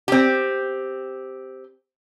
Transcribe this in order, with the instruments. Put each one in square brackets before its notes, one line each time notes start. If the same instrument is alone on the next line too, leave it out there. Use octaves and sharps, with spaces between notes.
[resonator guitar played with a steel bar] C4 G4